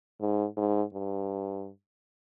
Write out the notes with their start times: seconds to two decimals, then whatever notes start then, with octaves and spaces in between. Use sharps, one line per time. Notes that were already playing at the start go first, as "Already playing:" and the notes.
0.21 G#2
0.57 G#2
0.93 G2